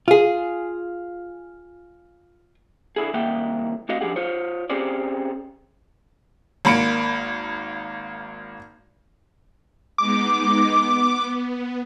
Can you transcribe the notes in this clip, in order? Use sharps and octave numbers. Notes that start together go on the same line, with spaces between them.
F4 G#4
D3 E4 G#4
C2 D#3 A#3 E5 F#5 G5
A3 C4 F#4 D#5 F5
F3 D4 G4 G#4 F#5
F4 C5 C#5
C4 C#4 G4 G#4 C5 D5
G#1 A#3 B5 C#7 D7
G#3 B3 D#4 D6
B3